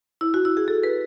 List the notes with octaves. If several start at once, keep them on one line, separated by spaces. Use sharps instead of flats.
E4
F#4
E4
G#4
A4
B4